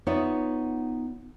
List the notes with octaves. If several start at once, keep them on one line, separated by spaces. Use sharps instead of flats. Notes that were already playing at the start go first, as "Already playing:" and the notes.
B3 D#4 F4 C#5 D5 E5